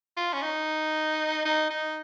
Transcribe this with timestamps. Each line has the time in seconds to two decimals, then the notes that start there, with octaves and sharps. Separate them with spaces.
0.17 F4
0.33 C#4
0.42 D#4
1.45 D#4
1.70 D#4